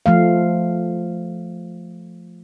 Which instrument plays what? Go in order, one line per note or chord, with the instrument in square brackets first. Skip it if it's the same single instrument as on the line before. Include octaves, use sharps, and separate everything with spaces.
[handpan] F3 A3 F5